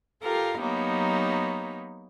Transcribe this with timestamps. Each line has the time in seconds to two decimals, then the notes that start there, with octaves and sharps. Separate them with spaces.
0.22 F4 G4 A4 A#4 F5
0.60 F#3 A#3 B3 D#4 G4 C#5